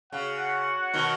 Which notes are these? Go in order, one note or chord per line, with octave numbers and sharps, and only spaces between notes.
C#3 F#4 C#5 F#5
B2 D#3